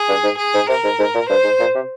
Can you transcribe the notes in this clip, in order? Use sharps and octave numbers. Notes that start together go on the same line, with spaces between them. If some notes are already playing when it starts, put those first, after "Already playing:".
Already playing: G#4
G2
G#2
G#4
G#2
C3 A#4
G#2
G#2
A#2
G2 C5
G#2
A#2
C3